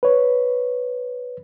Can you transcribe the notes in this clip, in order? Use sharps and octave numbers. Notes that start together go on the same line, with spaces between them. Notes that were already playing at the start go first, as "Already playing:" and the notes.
B4 C#5